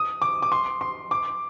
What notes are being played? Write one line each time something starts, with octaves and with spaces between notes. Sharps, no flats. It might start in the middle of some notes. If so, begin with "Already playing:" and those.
Already playing: D#6
D6
D6
C6
C6
D6